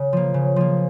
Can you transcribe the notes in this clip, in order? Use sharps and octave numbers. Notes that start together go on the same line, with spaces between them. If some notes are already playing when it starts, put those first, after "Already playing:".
Already playing: C#3
F3 A#3
C#3
F3 A#3